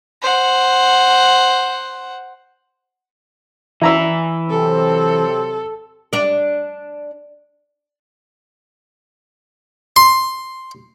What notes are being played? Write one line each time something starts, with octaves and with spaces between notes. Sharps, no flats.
C5 F#5
E3 E4 B4 A#5 E6
C3 F#3 C4 A4
D4 D5
C6